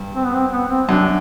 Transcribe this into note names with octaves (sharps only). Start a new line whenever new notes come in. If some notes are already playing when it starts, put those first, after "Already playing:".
Already playing: G2
C4
B3
C4
B3
C4
F#2 D4